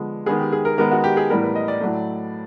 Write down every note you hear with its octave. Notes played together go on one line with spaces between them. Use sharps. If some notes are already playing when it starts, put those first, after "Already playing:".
Already playing: D3 F3 G#3 B3
D#3 G#3 B3 G#4
G4
G#4
A#4
D#3 G#3 B3 A#4
F#4
G4
G#4
A2 E3 G3 B3 A#4
B4
D#5
D5
A2 F#3 A3